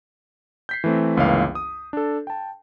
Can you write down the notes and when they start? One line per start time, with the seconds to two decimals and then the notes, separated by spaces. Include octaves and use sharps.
0.69 G6 B6 C7
0.84 E3 A3 C4
1.17 G1 C#2 E3 A#3 C#5 F5
1.55 D#6
1.93 D4 A4
2.27 G5 A5